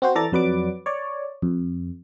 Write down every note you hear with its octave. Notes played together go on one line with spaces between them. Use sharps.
C4 F#4 C5
E3 A4 D5 A#5 A6
F2 F#3 B4 D5 D6
C#5 D5
F2